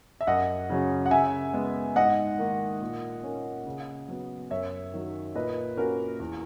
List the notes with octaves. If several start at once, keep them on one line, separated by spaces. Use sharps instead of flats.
E5
F#2 D#5 F#5
C#3 F#3 C#4
F#5
C#3 E5 G#5
G#3 B3
G#2 D#5 F#5
D#3 A#3
A#2
A#3 C#4
C#3
F#3 B3
F#2 C#5 E5
D#3 F#3
A#2 B4 D#5
A#3 C#4 F#4 A#4
E2